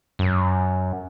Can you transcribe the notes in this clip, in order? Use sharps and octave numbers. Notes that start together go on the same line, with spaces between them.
F#2